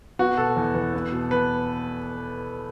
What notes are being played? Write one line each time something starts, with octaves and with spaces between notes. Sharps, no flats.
B3 F#4
B2 A4
E2
E2
B3
B2
B3 B4